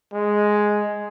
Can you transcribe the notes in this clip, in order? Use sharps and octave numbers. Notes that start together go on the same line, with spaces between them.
G#3